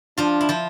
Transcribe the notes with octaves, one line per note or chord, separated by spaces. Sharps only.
F3 D4 F4
E4
F3 F4